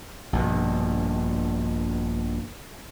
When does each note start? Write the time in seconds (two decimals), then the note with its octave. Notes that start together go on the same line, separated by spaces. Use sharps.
0.33 A#1 G2 B2